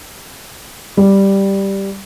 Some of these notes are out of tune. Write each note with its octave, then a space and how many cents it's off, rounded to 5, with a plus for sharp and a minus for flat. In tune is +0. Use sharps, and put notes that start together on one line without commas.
G3 +0